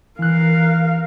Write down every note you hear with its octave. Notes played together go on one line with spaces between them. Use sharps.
E3 A#4 F5 F#6